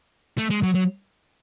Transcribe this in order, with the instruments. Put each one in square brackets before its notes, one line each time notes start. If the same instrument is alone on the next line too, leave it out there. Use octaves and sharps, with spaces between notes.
[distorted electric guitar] A3
G#3
F#3
F#3